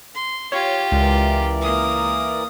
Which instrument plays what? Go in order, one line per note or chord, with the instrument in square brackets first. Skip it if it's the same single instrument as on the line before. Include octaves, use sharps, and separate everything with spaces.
[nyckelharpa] C6
[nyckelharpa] F4 G4 [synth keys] C#5
[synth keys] C#2 [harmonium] E3 A#4 D5
[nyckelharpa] A#3 D#6